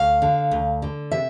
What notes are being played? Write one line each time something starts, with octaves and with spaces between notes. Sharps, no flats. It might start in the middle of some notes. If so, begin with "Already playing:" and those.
Already playing: D2 F5
D3
D2
D3
C3 E5